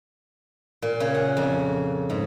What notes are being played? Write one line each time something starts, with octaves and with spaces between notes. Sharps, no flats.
A#2
C#3
F#5
F2
G#2